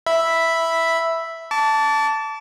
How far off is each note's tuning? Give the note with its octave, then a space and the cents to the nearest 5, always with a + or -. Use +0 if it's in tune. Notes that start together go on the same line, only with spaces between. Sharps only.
E5 +0 B5 +0
A5 +0 D6 -35